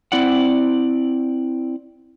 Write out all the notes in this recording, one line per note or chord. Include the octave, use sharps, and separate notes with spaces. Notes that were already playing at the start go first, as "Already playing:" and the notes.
C4 E4 D5 F#5